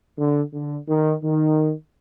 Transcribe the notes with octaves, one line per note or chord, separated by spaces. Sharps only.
D3
D3
D#3
D#3